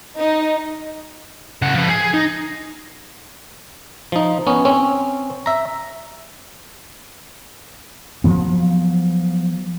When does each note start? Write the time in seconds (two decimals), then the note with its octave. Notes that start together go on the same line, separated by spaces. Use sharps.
0.18 D#4
1.62 C#3 F#5
1.74 F3 B4
1.89 G#4
2.14 D#4
4.12 F3 D#4
4.47 B3 C#4
4.65 C4 C#4
5.46 E5 A#5
8.24 F3 F#3 B3